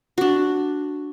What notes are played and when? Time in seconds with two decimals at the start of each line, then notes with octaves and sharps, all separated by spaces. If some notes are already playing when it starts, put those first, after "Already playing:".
0.18 D4 F#4